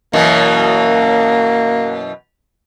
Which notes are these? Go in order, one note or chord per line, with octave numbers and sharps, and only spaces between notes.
F#2 B2 E3 A#3